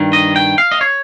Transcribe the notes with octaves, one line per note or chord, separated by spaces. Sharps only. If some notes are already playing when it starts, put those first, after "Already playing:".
Already playing: G2 D#3
D#5
G5
F5
D#5
C#5